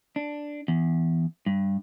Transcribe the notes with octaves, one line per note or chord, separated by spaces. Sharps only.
D4
E2
G2